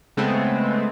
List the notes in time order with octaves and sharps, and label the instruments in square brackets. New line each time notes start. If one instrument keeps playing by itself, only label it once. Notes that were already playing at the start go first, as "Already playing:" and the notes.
[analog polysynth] C#3 G#3 A3 B3 C4